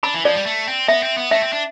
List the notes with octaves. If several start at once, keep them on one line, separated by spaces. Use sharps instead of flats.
D4 B5
E3
F3 D5
G3
A3
C4
B3 E5
C4
B3
A3 E5
C4
D4